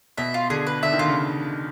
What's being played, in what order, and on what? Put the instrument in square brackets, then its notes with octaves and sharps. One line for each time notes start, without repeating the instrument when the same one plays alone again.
[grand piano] B2 [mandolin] E5
[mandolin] F4
[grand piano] D3 [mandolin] G#4
[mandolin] B4
[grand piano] D3 [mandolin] E5
[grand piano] D#3
[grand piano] D3 [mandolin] F4
[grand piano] C#3